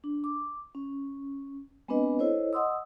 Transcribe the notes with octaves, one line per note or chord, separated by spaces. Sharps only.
D4
D6
C#4
G#3 B3 C4 D4 B4 D#5
E4 A4 C5 C#5 D#5
D#5 F#5 C6 D#6 E6